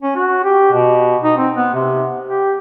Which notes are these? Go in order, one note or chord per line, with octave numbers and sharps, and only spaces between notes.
C#4
F#4
G4
B2
D#4
C4
B3
C3
G4